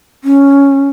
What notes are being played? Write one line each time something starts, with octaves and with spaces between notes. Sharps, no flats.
C#4